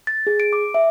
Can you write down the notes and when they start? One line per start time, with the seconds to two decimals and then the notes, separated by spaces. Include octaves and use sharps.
0.07 A6
0.27 G#4
0.40 D7
0.53 D6
0.74 E5